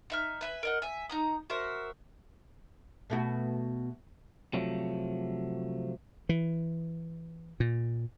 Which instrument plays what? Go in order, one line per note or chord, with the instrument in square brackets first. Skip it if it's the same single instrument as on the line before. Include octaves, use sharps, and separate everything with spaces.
[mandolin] D#4 E5 F6
B4 E5 G#5
A#4 D#5 F#5
E5 G#5
D#4 A#5 D#6
F#4 A#4 C5 E5
[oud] B2 A3 F#4
[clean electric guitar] C3 F3 F#3 A3
[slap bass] E3
A#2